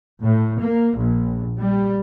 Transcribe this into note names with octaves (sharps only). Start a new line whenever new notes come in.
A2
A#3
A#1
G3